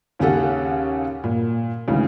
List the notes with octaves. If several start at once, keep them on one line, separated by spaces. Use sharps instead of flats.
D#2 C#3 C#4 G4 A4 F#5
A#2
D2 G#2 C#3 E3